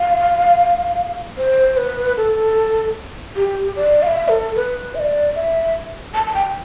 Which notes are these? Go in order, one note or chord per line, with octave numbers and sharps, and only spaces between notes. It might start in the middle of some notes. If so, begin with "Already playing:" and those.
Already playing: F5
C5
B4
A4
G4
D5
F5
E5
A4
B4
E5
D5
E5
A5
A5
G5